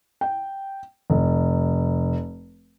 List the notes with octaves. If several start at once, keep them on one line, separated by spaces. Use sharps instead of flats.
G5
F1